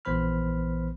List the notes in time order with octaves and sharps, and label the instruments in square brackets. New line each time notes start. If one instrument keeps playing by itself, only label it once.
[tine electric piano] A#1 E3 B3 C5 B5 F6